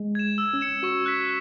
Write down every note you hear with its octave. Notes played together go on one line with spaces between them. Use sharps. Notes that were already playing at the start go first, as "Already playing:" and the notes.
Already playing: G#3
G#6 E7
E6
C#4
C#7 E7
F#4 C#6
F#6 B6